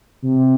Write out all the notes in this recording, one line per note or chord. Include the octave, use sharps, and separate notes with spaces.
C3